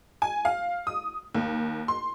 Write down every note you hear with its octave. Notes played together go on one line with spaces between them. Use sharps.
G#5
F5
D#6
D#2
C6